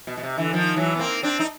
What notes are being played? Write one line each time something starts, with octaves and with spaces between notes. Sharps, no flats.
B2
B2
C3
D3 E3
D#3 F3
E3 F#3
B3
A#3 C4
C4 D4
D#4